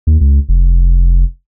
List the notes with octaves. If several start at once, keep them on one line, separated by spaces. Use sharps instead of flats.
D#2
C#2
F1